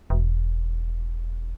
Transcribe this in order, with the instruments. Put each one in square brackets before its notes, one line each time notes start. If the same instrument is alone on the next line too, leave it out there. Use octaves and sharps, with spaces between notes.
[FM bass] E1